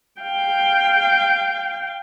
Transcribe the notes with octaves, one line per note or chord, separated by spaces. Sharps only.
F5 G5